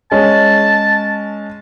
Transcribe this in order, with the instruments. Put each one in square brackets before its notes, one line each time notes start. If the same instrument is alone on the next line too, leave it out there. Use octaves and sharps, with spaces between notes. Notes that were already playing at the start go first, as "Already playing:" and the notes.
[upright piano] G#3 C#4 [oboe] A5